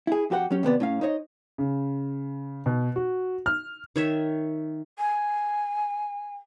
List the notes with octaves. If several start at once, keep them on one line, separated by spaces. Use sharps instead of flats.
E4 G#4
F2 F#4 G4 A#4 F#5
F#3 C#4 G4
D#2 C3 B3 D5
A2 C#4 F5
D#4 C5 C#5 D#5
C#3
B2
F#4
F6
D#3 C#5 E5
G#5